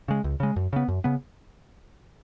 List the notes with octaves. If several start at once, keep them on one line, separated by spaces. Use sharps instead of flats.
C#3 G#3
C#2
C#3 G#3
F#2
C#3 B3
F#2
C#3 B3